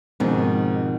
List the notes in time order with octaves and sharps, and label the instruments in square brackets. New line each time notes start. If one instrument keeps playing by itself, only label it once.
[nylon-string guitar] F2 B2 D#3 [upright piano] G#2